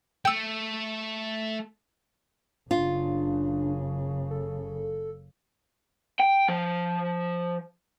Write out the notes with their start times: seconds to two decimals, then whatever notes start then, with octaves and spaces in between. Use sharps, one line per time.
0.25 A3 G5 E6
2.71 F#1 C#3 D4 F4
4.31 A4
6.20 G5
6.49 F3